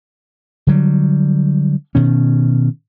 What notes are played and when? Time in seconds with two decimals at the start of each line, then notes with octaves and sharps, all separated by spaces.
0.67 D3 F#3 G3
1.95 B2 D#3 C#4